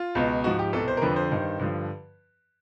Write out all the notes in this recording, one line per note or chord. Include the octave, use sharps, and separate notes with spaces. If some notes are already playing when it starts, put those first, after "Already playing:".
Already playing: F4
C#2 B2
G#2 F3 F#4
G4
C2 B2 A4
C5
A#4
F2 D3 F3 B4
C5
G2 D#3
G2 D3 F3